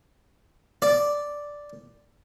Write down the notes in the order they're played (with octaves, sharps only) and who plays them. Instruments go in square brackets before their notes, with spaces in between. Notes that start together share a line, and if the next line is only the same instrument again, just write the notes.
[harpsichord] D5